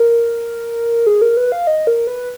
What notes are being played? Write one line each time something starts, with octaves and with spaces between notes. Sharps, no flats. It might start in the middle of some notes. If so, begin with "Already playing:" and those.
Already playing: A#4
G#4
A#4
B4
F5
D#5
A#4
B4